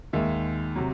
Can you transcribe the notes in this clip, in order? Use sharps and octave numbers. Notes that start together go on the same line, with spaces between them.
D#2 D#3 G#3 E5
C3 F#3